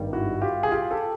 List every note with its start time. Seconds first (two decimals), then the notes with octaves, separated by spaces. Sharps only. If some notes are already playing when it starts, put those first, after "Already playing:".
Already playing: G#1 G2 D#3 G3
0.13 E4 F#4
0.42 F4 G4
0.63 G#4
0.71 F4 G4
0.91 G4 A4